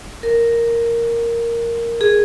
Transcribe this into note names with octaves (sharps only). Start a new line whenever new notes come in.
A#4
G#4